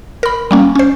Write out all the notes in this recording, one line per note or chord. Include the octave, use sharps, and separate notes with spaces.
A#4 B5
G3 A#3 C#4
C#4 C5